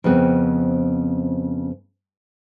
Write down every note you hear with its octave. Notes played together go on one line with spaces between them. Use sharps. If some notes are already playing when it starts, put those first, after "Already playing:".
F2 C#3 B3 C4